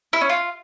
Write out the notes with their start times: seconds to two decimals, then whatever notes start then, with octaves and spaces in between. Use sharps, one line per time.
0.13 E4
0.21 C#4
0.29 F4